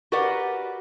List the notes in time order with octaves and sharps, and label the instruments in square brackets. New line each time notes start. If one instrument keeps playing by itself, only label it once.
[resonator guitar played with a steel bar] F#4 G4 A#4 B4 D5 F#5